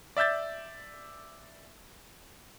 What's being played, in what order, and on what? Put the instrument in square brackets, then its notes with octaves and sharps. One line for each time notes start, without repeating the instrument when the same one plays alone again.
[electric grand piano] D5 E5 E6 G6 A6